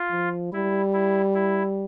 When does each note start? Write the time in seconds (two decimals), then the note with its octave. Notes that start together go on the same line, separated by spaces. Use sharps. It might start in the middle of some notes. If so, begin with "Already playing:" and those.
Already playing: F4
0.12 F3
0.53 G3 E4
0.93 E4
1.34 E4